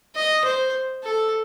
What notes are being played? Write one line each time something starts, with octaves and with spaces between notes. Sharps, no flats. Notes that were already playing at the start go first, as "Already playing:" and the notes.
D#5
C5
A4